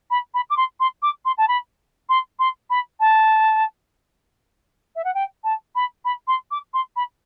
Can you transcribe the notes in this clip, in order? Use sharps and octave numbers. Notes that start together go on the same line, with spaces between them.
B5
B5
D6
C6
C6
D6
C6
A5
B5
C6
C6
B5
A5
E5
F#5
G5
A5
B5
B5
C6
D6
C6
B5